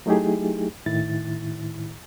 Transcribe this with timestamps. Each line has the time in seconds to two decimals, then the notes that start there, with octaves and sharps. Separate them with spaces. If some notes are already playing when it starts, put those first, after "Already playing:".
0.06 F#3 A3 D#4 E4 G4 G#4
0.86 A2 D#3 E4 A6